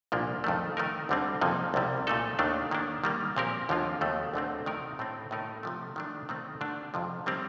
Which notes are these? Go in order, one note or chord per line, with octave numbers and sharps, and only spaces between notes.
C2 A#2 F3 A#3 D4
F2 D#3 A3
D#3 A3 D#4 A#4
D2 D3 G3 C4
F2 C3 F3 A#3 D#4
C2 C3 G3
A#2 A3 D#4 A4
D#2 D#3 A3 D4
D#3 A#3 D4
D#3 G3 A#3
A#2 F3 C4 G4 A#4
D#2 D3 F3 A#3 F4
D#2 D#3 A3
D2 D3 A3 C4
C3 D#3 A3 D#4 A#4
A2 A3 C4
A2 A3 D#4 A#4
C3 F3 A3
D#3 A3 D4
D#3 A3 C4
D3 A3 D4
F2 C3 F3
D#3 G3 C4 G4